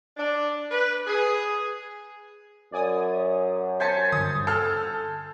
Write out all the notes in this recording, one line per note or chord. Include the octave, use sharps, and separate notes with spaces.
D4
B4
G#4
F#2 D5 G#5 D#6
C5 G#5 A5 B6 C#7
G2 D3 D#6
A4 F6